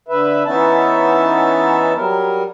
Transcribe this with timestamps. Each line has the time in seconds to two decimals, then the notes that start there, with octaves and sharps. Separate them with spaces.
0.08 D3 B4 E5
0.46 E3 B3 C#4 D#4 E5 A5
1.95 F#3 G3 A#4